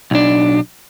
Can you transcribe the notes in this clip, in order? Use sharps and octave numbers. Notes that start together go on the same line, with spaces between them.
B1 D4